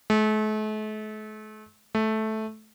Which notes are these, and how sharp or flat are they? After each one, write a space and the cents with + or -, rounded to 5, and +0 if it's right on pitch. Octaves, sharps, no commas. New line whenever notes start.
A3 -40
A3 -10